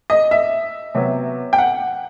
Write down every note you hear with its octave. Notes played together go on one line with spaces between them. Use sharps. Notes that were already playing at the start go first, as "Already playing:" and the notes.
D#5
E5
C3 F#3 B3
G5
F#5